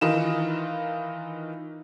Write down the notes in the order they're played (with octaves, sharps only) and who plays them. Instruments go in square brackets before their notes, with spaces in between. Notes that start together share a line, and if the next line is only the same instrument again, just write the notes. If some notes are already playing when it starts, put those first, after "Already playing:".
[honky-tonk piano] D#3 E3 D#4 F4 E7